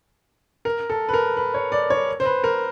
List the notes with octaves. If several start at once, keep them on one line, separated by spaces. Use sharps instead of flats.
A#4
A4
B4
A#4
B4
C#5
D5
C#5
C5
B4
A#4